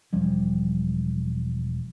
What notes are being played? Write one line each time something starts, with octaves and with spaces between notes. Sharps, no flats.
E1 F3 G3 C#4